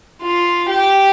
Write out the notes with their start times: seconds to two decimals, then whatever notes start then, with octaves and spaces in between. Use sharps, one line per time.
0.22 F4
0.69 G4